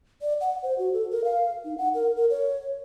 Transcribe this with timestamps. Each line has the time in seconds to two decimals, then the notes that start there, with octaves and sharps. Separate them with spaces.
0.22 D5
0.41 F#5
0.63 C5
0.78 F#4
0.93 A4
1.11 A#4
1.24 F5
1.65 D#4
1.78 F#5
1.94 A#4
2.16 A#4
2.30 C#5